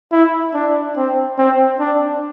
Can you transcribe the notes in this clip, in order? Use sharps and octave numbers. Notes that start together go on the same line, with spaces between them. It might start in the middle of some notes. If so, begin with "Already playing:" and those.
E4
D4
C4
C4
D4